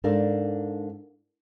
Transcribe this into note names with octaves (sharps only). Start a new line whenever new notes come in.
G#2 D4 A4 A#4 F5